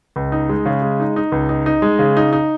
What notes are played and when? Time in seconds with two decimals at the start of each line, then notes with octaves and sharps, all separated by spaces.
0.16 C#2
0.32 D#4
0.49 G#3
0.66 C#3
0.82 G#3
1.00 D#4
1.16 D#4
1.32 C#2
1.49 D#4
1.66 D#4
1.82 G#3
1.99 C#3
2.17 D#4
2.33 D#4